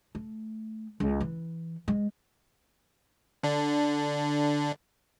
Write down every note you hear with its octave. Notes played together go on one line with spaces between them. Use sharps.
A3
C#2
E3
G#3
D3 D4